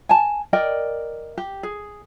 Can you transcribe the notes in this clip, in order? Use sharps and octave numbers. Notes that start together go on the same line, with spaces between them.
G#5 A5
A#4 D5 D#5 G5
G4
G#4